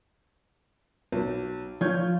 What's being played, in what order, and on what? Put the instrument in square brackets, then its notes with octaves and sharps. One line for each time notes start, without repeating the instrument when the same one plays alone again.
[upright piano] B1
[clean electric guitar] F3 F4 [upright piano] C#5 G6 G#6